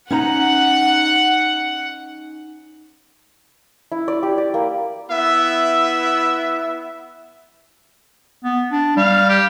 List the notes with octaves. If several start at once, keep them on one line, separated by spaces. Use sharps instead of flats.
C#4 D#4 F#5 A#5
E4
D5
G4
D5
A#3
B3 E4 E5
B3
D4
G3 F5
G4